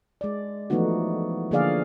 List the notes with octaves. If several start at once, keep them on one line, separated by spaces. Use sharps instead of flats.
G#3 D5
E3 F3 A3 B3 D#4 F#4
D3 F3 A#3 G#4 D5 F5